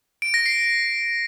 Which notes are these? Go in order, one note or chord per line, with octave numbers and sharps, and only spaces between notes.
D7
A#6
C7